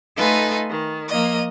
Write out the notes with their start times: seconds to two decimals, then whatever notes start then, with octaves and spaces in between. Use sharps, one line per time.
0.17 A3 D#4 F4 A4 B4 G#5
0.68 D#3
1.09 F3 A#3 D#5